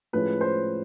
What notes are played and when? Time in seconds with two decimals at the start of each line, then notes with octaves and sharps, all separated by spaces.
0.13 A2 F3 G#3 C#4 E4 B4
0.41 C5